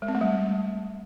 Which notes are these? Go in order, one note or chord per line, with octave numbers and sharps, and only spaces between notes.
G#3
C4
A3
G3